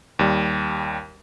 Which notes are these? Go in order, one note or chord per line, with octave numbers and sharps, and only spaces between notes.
D#2 G3